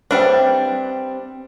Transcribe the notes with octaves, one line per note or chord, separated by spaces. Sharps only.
G3 C4 D4 G4 B4 E5 G5